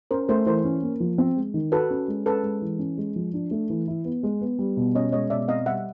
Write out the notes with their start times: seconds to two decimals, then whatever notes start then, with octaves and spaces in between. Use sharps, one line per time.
0.11 C#4 A#4 C5
0.28 A3 A#4 C5
0.46 E3 A#4 C5
0.65 C#4
0.83 A#3
1.00 F3
1.18 C4
1.37 G#3
1.54 D#3
1.72 F#4 A4 B4
1.90 C#4
2.08 G#3
2.26 C#4 A4 B4
2.43 G#3
2.62 E3
2.79 C#4
2.98 G#3
3.16 F3
3.34 D4
3.51 A3
3.70 E3
3.88 E4
4.05 B3
4.23 G#3
4.41 B3
4.59 G3
4.77 B2
4.95 C#4 C#5 D#5
5.12 G#3 C#5 D#5
5.30 B2 D5 E5
5.48 C4 D#5 F5
5.66 G3 E5 F#5